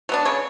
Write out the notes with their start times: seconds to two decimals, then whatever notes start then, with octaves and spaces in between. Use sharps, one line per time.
0.09 F#3 B3 D4
0.25 C#3 C#5